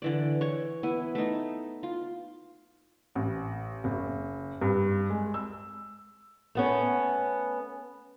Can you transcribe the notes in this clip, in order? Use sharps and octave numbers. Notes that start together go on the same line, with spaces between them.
D3 E3 D5
C#5 C#6
B3 E4 G#5
A3 D#4
F4
A1
F#1
G2
G#3
E6
A3 B3 C#4